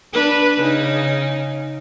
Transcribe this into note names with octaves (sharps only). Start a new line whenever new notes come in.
D4 B4
C#3 D#4